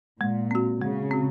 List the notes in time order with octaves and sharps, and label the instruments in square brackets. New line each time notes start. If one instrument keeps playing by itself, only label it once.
[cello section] A#2 [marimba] G#3
[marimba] C4 F#4
[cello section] C#3 [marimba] G#3
[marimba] C4 F#4